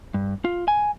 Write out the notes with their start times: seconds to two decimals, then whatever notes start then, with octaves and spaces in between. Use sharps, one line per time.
0.14 G2
0.45 F4
0.68 G#5